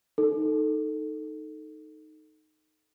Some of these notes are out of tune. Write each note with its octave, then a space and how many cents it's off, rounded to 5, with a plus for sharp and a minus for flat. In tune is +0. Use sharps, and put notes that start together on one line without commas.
D#4 +0 A4 +0